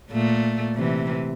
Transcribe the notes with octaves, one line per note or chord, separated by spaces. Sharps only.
A#2 A3
C3 E3